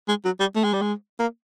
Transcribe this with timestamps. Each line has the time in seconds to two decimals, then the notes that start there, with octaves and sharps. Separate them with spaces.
0.08 G#3
0.25 F#3
0.40 G3
0.56 A3
0.64 G#3
0.73 G3
0.82 G#3
1.20 A#3